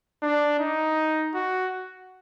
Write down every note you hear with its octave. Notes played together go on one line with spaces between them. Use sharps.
D4
D#4
F#4